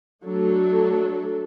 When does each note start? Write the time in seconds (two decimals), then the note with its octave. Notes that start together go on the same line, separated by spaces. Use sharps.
0.24 F#3 A3 D4 A4